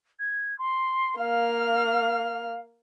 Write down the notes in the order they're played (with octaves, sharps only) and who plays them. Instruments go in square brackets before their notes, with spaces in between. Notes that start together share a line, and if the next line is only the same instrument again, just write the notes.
[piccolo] G#6
C6
[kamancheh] A#3 F6 [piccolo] F5